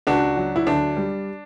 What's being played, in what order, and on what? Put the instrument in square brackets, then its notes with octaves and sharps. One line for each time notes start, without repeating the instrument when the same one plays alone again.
[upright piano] C#2 D4 F#4
F#3
E4
D2 D4
G3